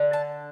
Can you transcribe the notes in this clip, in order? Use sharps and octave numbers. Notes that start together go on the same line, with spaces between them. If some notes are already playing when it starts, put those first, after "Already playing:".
Already playing: D3
A5